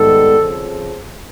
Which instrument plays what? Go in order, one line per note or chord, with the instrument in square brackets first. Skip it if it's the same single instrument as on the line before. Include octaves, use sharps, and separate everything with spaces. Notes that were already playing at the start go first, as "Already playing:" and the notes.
Already playing: [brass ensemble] G#2 D#3 G3 B3 A4
F2 C#3 F3